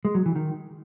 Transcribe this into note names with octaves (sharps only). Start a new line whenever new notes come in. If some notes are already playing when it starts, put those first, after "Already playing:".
G#3
F#3
E3
D#3